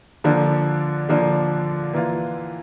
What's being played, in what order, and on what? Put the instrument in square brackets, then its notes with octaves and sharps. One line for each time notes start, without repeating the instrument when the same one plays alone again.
[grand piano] D3 F3 A#3 D4
D3 F3 A#3 D4
E3 A#3 F4